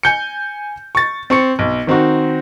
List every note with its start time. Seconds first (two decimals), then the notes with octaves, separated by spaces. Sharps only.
0.03 G#5 G6 C#7
0.95 C#6 A6
1.30 C4 C#6 C#7
1.59 B1
1.87 D#3 C4 D#4 F#4